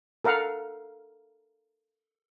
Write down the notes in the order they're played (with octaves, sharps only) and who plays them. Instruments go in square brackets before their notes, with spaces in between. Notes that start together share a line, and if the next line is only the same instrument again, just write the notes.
[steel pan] A4 A#4 F5 F#5